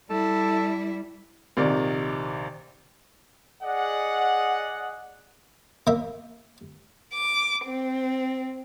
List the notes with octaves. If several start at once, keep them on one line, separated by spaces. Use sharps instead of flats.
G3 E4 A4
A#1 C3 D#3 D5
G#4 D5 D#5 F#5
A#3 E5
D6
C4